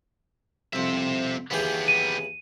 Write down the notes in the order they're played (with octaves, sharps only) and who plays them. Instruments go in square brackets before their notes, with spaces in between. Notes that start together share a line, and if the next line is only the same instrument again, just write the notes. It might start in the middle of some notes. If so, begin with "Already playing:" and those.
[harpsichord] C2 F2 [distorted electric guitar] C4 E5
[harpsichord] D#2 E3 G#4 [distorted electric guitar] B3 G4
[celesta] D#7